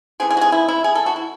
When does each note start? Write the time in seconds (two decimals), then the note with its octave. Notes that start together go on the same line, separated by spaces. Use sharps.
0.20 E3 A3 C4 G#4
0.30 G#4
0.37 F#4
0.41 G#4
0.52 E4
0.68 E4
0.84 G#4
0.95 A4
1.06 F#4
1.16 E4